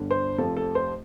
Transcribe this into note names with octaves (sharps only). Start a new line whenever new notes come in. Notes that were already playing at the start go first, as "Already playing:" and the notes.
Already playing: G1 G2 D3 G3
C5
F1 F2 F3 A4
A4
C5